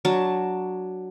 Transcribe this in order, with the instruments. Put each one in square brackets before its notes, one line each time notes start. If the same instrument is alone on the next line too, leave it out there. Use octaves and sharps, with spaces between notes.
[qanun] F#3 D4 A5